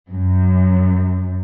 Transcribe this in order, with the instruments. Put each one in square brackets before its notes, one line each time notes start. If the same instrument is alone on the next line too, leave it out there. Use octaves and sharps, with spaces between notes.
[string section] F#2